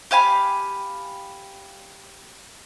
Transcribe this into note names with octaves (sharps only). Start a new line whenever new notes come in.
G4 F5 G#5 B5